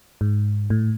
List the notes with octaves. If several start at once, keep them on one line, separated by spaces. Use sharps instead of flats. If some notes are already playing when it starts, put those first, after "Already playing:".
G#2
A2